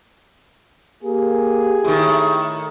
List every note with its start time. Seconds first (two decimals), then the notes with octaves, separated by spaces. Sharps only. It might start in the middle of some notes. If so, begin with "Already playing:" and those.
1.04 A#3 G4 G#4
1.84 A2 D#3 E4